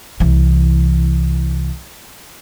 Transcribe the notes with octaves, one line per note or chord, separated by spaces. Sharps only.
C2 E3